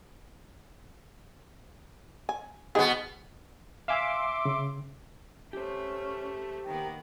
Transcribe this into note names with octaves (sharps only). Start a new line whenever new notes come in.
G#5
B2 B3 D#4 G#4
E5 F5 G#5 C6 D6 E6
C#3
A3 C#4 G4 C5
D#3 A#3 B3 G5